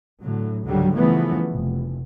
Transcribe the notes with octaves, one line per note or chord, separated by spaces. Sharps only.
A2 D3 F#3
C#2 G#2 D3 F#3 G3
C#3 E3 F3 G3 A3 B3
F1